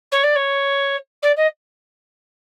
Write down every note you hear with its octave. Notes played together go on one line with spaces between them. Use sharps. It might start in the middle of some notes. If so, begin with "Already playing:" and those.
C#5
D5
C#5
D5
D#5